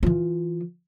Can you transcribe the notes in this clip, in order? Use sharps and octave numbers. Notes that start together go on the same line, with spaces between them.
E3 F4